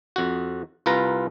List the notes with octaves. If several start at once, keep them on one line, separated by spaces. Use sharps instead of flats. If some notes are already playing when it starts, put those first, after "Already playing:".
F2 F#4
C2 F4 B4 A#5